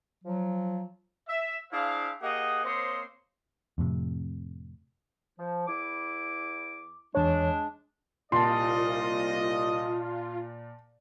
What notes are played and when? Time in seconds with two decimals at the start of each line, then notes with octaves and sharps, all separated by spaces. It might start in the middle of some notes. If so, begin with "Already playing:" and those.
0.24 F3 F#3
1.29 E5
1.73 D4 E4 G#4 C5 F5
2.22 A#3 G4 G#4 D#5 F#5
2.64 A#3 C4 C5 C#5 D#5 C6
3.78 F2 A2 C3
5.39 F3
5.68 E2 E4 D6
7.15 E2 G#3 D4 C#5
8.32 C2 A#2 F4 D#5 A5 C6